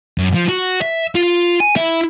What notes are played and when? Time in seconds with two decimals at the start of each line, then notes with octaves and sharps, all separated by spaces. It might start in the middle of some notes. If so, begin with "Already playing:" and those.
0.18 F#2
0.34 F3
0.49 F#4
0.81 E5
1.15 F4
1.60 G#5
1.76 E4